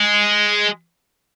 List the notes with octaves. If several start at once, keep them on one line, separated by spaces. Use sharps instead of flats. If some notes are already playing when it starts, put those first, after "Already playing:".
Already playing: G#3